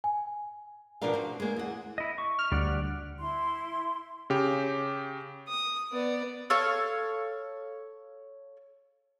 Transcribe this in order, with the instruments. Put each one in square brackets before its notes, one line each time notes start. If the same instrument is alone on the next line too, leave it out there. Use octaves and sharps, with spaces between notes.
[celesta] G#5
[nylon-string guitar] B2 F3 B3 D4 A#4 F5
C4 F#4
G#3 A#3
E2 F#5
[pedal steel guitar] E4 D#5
C#6
[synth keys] F6
[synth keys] D2 [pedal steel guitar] G3 D5 F#5
[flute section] E4 C6
[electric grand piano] C#3 G4
[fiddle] D#6
B3 D5
[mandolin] A4 C#5 F5 C#6